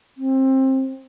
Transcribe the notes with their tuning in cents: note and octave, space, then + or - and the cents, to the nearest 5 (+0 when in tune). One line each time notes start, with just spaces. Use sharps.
C4 +25